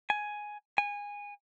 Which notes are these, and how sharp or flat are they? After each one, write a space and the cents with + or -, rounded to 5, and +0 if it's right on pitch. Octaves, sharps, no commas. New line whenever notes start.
G#5 +5
G#5 -20